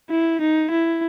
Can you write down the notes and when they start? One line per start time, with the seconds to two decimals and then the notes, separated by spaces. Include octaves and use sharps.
0.10 E4
0.41 D#4
0.71 E4